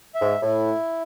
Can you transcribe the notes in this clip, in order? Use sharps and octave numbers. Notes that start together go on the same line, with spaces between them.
E5
G#2
A2 E4